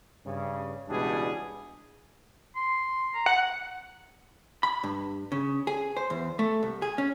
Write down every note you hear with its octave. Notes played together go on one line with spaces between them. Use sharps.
G2 C#3
C#2 B2 E3 G3 D4 G#4
C6
A#5
F#5
B5
G2
C#3
G#4
C5
E2
A3
C2
G#4
C#4